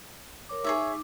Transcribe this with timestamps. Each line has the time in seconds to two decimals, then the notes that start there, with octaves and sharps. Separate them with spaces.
0.49 A#4 C#5 D6
0.64 D#4 G#4 C#5 E5 D6